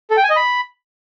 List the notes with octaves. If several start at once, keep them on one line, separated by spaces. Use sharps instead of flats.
A4
G5
G#5
D#5
B5